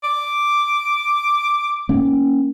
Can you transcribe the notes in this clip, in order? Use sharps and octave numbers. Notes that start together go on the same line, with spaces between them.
D6
A#3 C#4